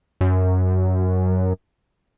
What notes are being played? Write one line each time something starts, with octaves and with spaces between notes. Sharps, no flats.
F#2